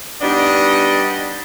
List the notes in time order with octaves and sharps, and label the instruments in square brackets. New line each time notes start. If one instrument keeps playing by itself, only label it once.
[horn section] G3 B3 D4 D#4 D#5